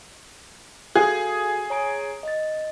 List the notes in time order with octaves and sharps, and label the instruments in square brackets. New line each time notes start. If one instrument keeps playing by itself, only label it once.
[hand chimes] F#4 A4 F5 [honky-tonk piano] G#4
[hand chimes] C#5 A#5 D7
D#5 A6